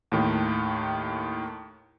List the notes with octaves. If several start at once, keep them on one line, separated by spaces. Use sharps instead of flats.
D#2 A2 D#3